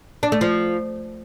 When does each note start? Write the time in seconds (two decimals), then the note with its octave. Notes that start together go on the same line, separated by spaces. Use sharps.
0.23 D4
0.32 A3
0.41 F3